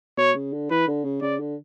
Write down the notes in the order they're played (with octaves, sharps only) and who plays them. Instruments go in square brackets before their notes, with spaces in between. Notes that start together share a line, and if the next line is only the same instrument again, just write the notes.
[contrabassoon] B2 [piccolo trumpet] C#5
[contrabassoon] C#3
D3
[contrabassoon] E3 [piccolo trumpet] B4
[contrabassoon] D3
C#3
[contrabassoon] C#3 [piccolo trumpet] D5
[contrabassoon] D3